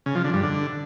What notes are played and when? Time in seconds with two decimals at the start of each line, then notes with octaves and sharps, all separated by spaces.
0.06 C#3
0.15 F3
0.24 D3
0.34 G2
0.43 D3